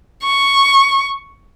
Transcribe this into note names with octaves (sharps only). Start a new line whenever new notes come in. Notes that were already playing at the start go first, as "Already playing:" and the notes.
C#6